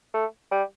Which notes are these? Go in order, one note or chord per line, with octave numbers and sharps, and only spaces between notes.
A3
G3